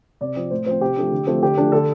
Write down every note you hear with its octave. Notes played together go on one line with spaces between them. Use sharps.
C3 D5
F3 C4
A2 C5
F3 C4 C5
C3 G4
F3 A3 D4
D3
F3 A3 C4
D3 G4
F3 A3 D4
D3 A4